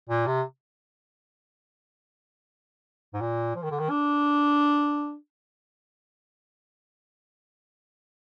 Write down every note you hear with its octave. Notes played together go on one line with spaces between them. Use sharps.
A#2
C3
G#2
A#2
F3
D#3
D3
D#3
D4